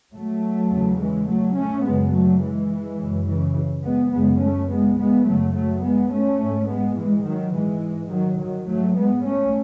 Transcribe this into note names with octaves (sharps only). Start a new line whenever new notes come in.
F#3 A3
E2 C#3
E3 G#3
F#3 A3
A3 C#4
F#2 C#3 G#3 B3
F#3 A3
E3 G#3
F#2 C#3
C#3 E3
G#3 B3
F#2 C#3 G#3 B3
A3 C#4
G#3 B3
G#3 B3
F#2 C#3 F#3 A3
F#3 A3
G#3 B3
A3 C#4
G#2
G#3 B3
E3 G#3
D#3 F#3
G#2 E3 G#3
D#3 F#3
D#3 F#3
G#2 F#3 A3
G#3 B3
A3 C#4